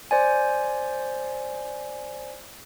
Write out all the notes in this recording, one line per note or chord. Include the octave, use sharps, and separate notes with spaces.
C5 D5 G#5